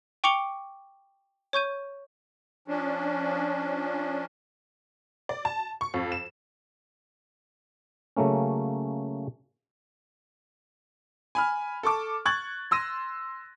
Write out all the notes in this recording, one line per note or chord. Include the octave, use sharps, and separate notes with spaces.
G5 C#6 D6 C#7 F7 G7
C#5 C#6 G6 D#7
F3 C#4 D4
D5
A5
C#6
F2
E7
C#3 F#3 A3 A#3 C#4
G#5 B5 F6
A4 A5 C#6 D6
C#6 F#6 G#6 A6 F#7
C6 E6 A#6 D#7